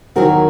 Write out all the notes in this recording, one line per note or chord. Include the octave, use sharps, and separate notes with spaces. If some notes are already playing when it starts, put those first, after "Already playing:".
E2 D#3 F#3 F#4 A#4